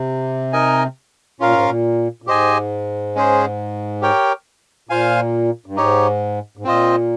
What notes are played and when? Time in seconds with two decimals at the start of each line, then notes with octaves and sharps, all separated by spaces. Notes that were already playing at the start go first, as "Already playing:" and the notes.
Already playing: C3
0.53 D#4 A#4 D#5 G#5
1.40 A#2 C#4 F4 A#4 F5
1.52 G#2
1.65 A#2
2.22 A#2
2.27 G#2 G4 C5 D#5 G#5
3.15 G#3 C#4 G#4 C5
4.02 G4 A#4 C#5 G5
4.89 A#2 F4 C5 F5 G#5
5.66 G2
5.77 G#2 D#4 G4 C#5
6.57 G#2
6.64 A#2 C4 F4 C5 D#5